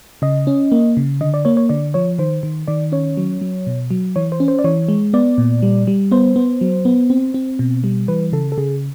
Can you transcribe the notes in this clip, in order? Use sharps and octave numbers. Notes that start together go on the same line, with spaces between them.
C#3 D#5
C#4
A#3
C#3
D3 D#5
D5
A#3 C#5
C#5
D3 D5
F3 C#5
D#3 C5
D#3
D#3 D5
C#4 C#5
F#3
F#3
B2
F#3
E3 C#5
C5
C#4
C5
D5
E3 C#5
G#3
B3 D5
A#2
G3
G3
B3 C5
B3
F#3
B3
C4
C4
B2
G3
E3 B4
C#3 A4
A4
C#3 G#4